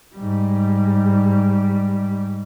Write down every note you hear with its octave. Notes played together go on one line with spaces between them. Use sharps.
G#2 G3